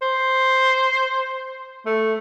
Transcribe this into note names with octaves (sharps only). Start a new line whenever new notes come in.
C5
A3